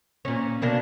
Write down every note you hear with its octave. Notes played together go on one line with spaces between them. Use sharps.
A#2 C#4
B2 A#3 D4